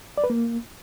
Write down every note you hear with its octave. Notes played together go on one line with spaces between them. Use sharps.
D5
B4
A#3